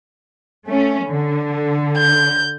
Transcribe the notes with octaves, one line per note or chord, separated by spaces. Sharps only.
A3 C#4
D3
G6